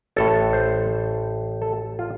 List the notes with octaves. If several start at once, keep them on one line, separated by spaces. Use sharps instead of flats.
A1 A2 A4
C5
A4
F4